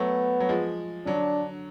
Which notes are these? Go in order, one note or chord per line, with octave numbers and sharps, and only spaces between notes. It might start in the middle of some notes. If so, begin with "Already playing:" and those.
Already playing: F#3 A3 B3
F#3
F3 G#3
D3 F#3 D4